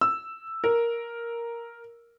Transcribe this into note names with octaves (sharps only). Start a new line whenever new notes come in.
E6
A#4